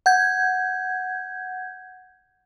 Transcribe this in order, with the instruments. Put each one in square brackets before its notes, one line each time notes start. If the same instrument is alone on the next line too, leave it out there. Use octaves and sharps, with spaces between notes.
[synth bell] F#5 G6 G#6